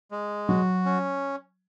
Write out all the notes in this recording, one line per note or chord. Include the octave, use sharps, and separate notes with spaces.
G#3
F#3 F#4
C#4